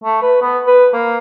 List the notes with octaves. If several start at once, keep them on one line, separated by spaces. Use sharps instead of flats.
A3
B4
B3
B4
A#3